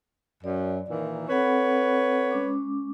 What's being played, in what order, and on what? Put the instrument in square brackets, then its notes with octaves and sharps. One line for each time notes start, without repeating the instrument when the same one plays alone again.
[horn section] F#2 [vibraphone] D5
[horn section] A#2 D#3 E3
[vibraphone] C4 A4 F#5 [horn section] B4 C#5
[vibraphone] G#3 C#4 D6